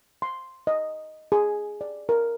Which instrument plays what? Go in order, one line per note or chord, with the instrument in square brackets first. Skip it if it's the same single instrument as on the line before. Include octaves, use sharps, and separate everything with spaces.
[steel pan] C6
D#5
G#4
D5
A#4